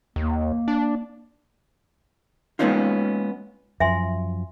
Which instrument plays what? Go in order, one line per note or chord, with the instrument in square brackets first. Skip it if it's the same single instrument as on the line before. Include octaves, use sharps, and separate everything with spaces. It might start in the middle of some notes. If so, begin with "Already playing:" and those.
[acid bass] D#2 [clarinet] A#3
[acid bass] D4
[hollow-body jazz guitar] G#3 A#3 B3 C#4 D#4 F4
[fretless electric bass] F#2 F3 [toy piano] E5 G#5 C6